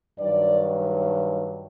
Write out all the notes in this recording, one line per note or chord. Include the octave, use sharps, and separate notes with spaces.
G2 D#3 F#3 D5